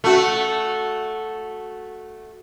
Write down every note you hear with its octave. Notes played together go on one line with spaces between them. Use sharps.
A3 F#4